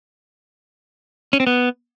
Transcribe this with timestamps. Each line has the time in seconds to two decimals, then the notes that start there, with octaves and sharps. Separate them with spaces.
1.33 C#4
1.40 C4
1.47 B3